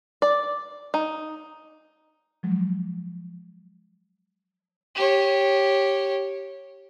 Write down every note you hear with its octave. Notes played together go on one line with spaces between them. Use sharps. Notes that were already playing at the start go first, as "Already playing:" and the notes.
D5
D#4
F3 F#3 G#3
G4 C#5